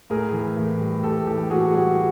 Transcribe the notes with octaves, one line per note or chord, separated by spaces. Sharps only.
A2 G#4 A#4
E3
A2
G3
A2 G4 A4
E3 G4 A4
A2 F#4 G#4
G3 F#4 G#4